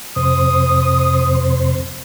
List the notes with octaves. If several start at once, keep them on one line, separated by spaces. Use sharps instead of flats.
F2 C3 C5 D#6